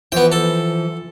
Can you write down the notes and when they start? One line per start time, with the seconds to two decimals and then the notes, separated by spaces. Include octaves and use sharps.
0.12 E3 F3 B3 G5
0.32 A4